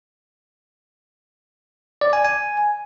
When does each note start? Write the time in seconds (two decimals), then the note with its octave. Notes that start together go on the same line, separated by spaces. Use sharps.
2.01 D5
2.13 G#5
2.24 G#5